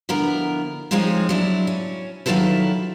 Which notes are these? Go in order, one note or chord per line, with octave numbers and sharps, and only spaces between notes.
D3 F3 B3 E4 A#4
F3 G#3 C4 C#4 D#4 F4
F#3 D4 E4
C#4
D#3 F#3 E4 F4 A4 B4